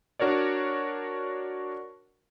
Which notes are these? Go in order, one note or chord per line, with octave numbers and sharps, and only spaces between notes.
D4 F#4 A#4 C#5 D5